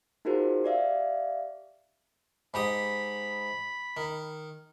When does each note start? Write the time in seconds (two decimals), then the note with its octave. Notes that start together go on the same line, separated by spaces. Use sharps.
0.25 D#4 F4 F#4 G#4 A#4 C5
0.64 G4 D5 E5 F5
2.54 G#2 G4 D#5 B5
3.97 D#3